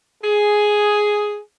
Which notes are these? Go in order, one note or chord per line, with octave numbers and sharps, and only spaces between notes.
G#4